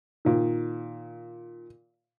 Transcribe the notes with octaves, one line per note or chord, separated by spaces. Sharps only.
A#2 D#3